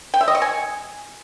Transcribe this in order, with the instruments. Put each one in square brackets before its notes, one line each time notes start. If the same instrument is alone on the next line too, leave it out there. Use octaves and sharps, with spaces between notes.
[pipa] G5
E5
D#5
C#6
G#5